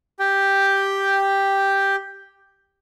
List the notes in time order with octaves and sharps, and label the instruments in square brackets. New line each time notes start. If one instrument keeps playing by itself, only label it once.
[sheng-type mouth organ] G4 G5